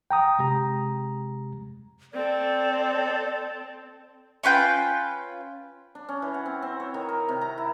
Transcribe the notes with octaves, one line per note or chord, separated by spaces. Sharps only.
G5 A#5 D#6
C3 G#3 G4 A#5
C4 A4 D5
C#4 F4 B4 G5
D4
C#4
E3
F#5
C4
C4
C#5
D#3
A#4
C3
A#5
E4